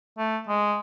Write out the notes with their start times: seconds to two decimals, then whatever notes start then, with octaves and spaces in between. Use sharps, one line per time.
0.18 A3
0.48 G#3